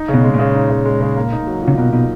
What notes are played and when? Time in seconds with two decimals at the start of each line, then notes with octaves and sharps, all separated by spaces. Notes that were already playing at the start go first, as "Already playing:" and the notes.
Already playing: D#4
0.08 C#3
0.14 B2
0.24 G#3
0.34 A#2
0.39 C#3
0.55 D#4
0.70 C#3
0.85 G#3
1.01 C#3
1.17 A#3
1.32 D#4
1.47 F#3
1.62 A#2
1.68 C#3
1.78 B2 A#3
1.93 B2 D#4